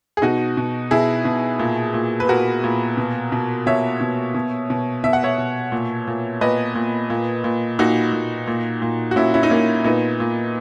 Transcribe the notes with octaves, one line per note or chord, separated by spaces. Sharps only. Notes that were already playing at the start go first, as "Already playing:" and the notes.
G#4
B2 D#4 F#4
B2
B2 E4 G#4
B2
A#2
A#2
B4
A#2 F#4 A#4
A#2
B2
B2
B2 C#5 E5
B2
B2
B2
B2 E5
F#5
C#5 E5
B2
A#2
A#2
A#2 B4 D#5
A#2
A#2
A#2
A#2 D#4 F#4
A#2
A#2
A#2
F#4
A#2 C#4 E4
C#4 E4
D#4
A#2 A#3 C#4
A#2 B3 D#4
A#2